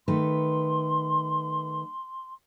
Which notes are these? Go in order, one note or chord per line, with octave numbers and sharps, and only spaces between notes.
D#3 A3 B4 C6